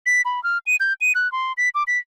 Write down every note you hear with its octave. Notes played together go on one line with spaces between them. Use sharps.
B6
B5
F6
D#7
G6
D#7
F#6
C6
B6
D6
B6